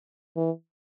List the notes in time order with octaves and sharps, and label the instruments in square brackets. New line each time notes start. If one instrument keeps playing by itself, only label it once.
[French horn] E3